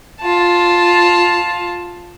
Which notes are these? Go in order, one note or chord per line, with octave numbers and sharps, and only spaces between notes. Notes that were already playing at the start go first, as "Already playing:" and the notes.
F4 A5